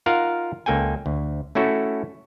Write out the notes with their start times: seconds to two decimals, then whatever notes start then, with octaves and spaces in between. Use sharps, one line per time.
0.06 D#4 F4 A#4 F5 F#5
0.66 C#2 A#3 A4 G5 G#5
1.06 D2
1.55 A3 C#4 E4 F#4 A4